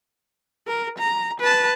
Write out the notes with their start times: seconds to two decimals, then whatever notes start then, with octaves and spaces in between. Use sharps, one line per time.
0.67 A#4
0.99 A#5
1.40 B4 A5